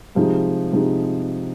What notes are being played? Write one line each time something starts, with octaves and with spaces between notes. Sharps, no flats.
C3 F3 G#3 D#4
C3 F3 G#3 D#4